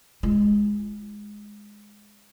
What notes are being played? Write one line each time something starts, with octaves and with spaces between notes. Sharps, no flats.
G#3 F4